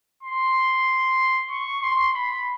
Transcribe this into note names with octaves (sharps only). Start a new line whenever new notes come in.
C6
C#6
C6
B5